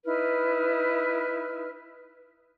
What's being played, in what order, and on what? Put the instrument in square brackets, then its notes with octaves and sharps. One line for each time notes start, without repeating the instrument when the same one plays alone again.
[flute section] D#4 E4 B4 F6